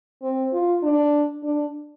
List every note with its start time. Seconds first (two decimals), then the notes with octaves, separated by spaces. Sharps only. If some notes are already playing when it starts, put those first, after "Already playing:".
0.23 C4
0.53 F4
0.83 D4
1.43 D4